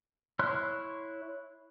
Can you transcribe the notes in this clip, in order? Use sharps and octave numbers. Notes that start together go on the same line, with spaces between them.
E4 C#5 C6 F6 F#6